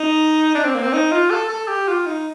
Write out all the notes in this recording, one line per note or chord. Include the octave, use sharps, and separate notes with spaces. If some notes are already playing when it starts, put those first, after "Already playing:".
Already playing: D#4
D4
C4
A#3
C4
D#4
F4
A4
A4
G4
F4
D#4